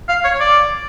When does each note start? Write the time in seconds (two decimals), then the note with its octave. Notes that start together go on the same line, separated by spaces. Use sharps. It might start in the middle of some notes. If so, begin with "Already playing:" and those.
0.09 F5
0.24 C#5
0.40 D5